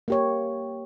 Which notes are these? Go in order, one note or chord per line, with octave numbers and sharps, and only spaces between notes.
A#3 G4 C#5